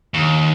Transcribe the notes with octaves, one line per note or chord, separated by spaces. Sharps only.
D#2